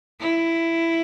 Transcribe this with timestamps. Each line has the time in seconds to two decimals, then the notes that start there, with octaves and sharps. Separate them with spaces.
0.20 E4